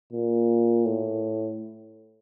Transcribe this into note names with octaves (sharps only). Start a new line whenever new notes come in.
A#2
A2